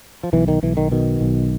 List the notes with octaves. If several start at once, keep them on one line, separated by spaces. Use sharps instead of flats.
F3
B1 E3
D#3
B1 E3
D#3
B2 D#3
B1